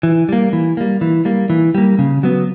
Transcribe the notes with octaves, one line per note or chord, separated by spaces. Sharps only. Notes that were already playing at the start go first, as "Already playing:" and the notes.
E3
G3 A#3
E3
G3 A#3
E3
G3 A#3
E3
G3 A#3
C#3
F#3 B3